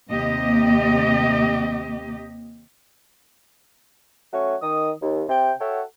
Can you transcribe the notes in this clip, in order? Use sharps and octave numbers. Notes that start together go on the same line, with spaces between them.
D#2 C3 A#3 G4 D#5
F#3 A3 C#4 F#4 C#5
D#3 D#6
D#2
C3 G5
F#4 A4 C#5 E5 F#5 G5